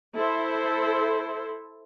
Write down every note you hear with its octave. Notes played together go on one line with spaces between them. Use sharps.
E4 A4 C5